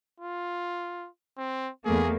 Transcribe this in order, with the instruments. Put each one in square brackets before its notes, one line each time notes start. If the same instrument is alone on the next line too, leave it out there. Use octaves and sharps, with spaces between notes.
[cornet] F4
C4
[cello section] E2 A3 A#3 [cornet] G#4